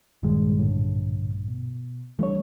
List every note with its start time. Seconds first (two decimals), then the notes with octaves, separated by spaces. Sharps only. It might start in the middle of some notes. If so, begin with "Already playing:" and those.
0.23 A#1 G2 D#3 G#3
0.59 A2 D3
1.48 B2
2.19 E3 G3 A3 D4 C#5